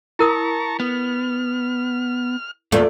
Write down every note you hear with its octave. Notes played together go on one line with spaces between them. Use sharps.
E4 A#4 A5 A#5 C#6 D#6
B3 F6
E2 A#2 A3 F4 D5